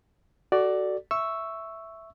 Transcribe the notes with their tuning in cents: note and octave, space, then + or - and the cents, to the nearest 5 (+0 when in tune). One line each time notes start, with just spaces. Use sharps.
F#4 +20 A4 +0 D5 +0
E5 +0 C#6 +0 E6 +0